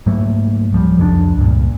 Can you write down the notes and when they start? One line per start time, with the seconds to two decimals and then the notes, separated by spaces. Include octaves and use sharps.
0.06 G#2 F#3 A3 A#3
0.72 D1 F3 G3
0.98 C2 F2 F3 D4
1.37 C#2 G2 A#2